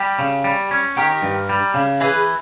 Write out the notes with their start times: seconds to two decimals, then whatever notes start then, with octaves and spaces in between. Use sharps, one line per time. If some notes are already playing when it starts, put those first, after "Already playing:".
Already playing: G3 G4
0.19 C#3
0.44 G3
0.71 C#4
0.97 D#3 G4 A#4
1.22 G2
1.49 G3
1.74 C#3
2.00 E3 G#4 B4